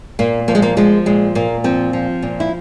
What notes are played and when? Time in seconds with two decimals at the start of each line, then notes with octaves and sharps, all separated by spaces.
0.19 A#2 A#3
0.48 F3 A#3
0.55 G#3
0.62 A#3
0.77 F3 G#3
1.06 A#2 G#3
1.35 A#2 A#3
1.64 F3 C4
1.93 F3
2.22 A#2
2.40 E4